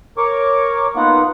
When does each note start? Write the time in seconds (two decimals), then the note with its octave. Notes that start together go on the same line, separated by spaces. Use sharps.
0.17 A#4 C#5 C#6 D6
0.96 A#3 B3 D#4 F4 F#5